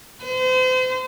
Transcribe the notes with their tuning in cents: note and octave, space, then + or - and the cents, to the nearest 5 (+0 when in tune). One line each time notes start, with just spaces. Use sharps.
C5 -35